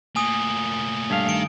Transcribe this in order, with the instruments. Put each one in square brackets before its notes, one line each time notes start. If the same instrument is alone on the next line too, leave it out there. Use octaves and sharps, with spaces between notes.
[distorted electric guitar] A2 A#3 [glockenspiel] G#5 D#6
[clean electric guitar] G2 A3 F5
[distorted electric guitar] D#3 [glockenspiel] D7